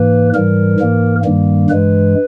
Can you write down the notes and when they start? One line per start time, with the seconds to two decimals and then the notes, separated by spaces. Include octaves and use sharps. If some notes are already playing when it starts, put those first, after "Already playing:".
Already playing: G#2 E3 A#3 B4
0.34 G#2 E3 G3 A#4
0.80 G#2 E3 A#3
1.24 G2 D#3 G3 A#3
1.70 G2 E3 G#3 B4